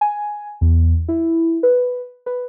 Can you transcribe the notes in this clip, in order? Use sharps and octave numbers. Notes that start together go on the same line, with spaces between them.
G#5
E2
E4
B4
B4